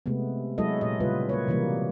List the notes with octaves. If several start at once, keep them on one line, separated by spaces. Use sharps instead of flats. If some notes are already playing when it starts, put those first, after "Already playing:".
C3 G#3 A3 B3
F#3 G#3 E4 F#4 A4 D#5
A#2 D#5
C#3 G3 F4 B4
A#3 B4 C#5
C3 E3 G3 A#3